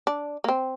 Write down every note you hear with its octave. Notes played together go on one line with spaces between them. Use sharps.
D4
A#3
C4